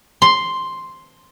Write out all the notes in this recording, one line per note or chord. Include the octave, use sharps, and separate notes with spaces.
C6